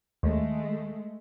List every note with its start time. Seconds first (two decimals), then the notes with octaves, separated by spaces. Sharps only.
0.23 D#2 G#3 A3